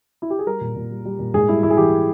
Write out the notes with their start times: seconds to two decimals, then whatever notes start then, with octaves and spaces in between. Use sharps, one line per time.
0.22 E4
0.30 G4
0.39 G#4
0.47 G3 A#4
0.61 A#2
0.76 A#2
0.91 G3
1.05 G3
1.19 A#2
1.34 G#2 G#4
1.49 G3 E4
1.63 G#2 E4
1.70 G#4
1.77 E3 G4